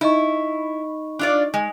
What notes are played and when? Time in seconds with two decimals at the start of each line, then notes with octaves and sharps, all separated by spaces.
0.01 D#4 E4 D#5 C#6
1.19 D4 F4 D5
1.54 G#3